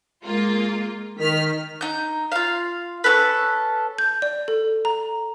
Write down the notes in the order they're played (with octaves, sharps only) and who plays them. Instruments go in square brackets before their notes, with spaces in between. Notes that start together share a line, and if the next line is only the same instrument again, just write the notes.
[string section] G#3 A#3 F4
[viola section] D#3 [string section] F6 B6
[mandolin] D#4 G6
F4 F5
C#4 F4 A4 B4
[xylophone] G6
D5
A4
A#5